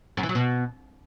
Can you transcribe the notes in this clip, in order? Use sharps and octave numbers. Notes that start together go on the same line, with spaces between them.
F#2
E3
F#3
B2